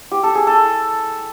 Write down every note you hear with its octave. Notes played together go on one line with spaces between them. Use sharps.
G4
A4
G#4
A4